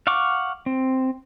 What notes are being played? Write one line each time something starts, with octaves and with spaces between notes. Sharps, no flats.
F5 F#5 C#6 D6
C4